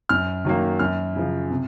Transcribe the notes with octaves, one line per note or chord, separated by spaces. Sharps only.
F#2 F6
D#3 F#3 A#3
F#2 F6
C#3 F3
C3